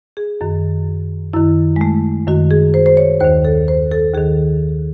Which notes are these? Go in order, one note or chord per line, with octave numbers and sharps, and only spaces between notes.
G#4
F#2 D#3
F#2 D#3 E4
G#3
A3
F#2 D#3 F#4
G#4
C5
C5
C#5
D#2 D#3 C5
A4
C5
A4
D#2 D#3 G#4